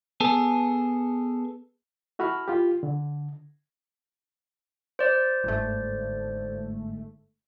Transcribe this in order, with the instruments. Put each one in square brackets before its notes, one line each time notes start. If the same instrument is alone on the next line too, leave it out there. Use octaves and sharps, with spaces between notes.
[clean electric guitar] B3 G#4 A4
[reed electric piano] E4 F#4 A4 B5 F6
F4 G4
D3
[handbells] C5 D5
[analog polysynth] G1 G#2 A3